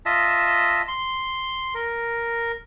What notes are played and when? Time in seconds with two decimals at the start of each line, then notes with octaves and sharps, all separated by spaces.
0.06 F4 D#5 E5 A5
0.88 C6
1.75 A#4